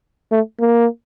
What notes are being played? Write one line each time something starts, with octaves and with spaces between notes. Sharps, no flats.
A3
A#3